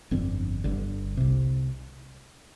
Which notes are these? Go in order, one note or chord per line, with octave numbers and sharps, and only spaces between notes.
G1 F2 D3 C4
G1 G2 D3
C2 C3